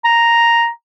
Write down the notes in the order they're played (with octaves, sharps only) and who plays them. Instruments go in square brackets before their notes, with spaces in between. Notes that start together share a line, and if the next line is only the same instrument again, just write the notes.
[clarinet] A#5